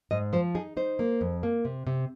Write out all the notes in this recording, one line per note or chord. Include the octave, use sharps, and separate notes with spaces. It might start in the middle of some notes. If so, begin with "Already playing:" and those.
G#2 D#5
F3 C5
D#4 G#4
D#4 C5
A#3
F2
A#3
C3
C3